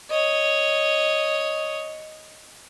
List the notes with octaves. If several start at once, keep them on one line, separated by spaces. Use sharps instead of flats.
C#5 D#5